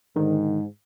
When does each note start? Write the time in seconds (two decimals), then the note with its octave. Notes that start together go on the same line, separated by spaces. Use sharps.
0.16 G#2 D3 D#3